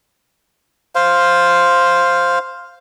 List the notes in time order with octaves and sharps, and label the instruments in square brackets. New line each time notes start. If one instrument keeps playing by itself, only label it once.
[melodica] C5 F5